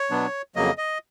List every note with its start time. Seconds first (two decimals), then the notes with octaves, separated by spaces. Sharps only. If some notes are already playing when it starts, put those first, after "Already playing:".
Already playing: C#5
0.10 B2 F#3 B3 D4
0.56 F2 C#3 F#3 A#3 D#5
0.78 D#5